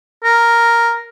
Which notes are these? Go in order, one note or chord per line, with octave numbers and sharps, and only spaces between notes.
A#4